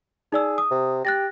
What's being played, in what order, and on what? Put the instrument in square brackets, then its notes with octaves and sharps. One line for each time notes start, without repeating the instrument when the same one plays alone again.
[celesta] D#4 D5 E6 [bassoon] G#4
[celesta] D#6
[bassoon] C3
[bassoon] G4 [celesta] F#6 A6 A#6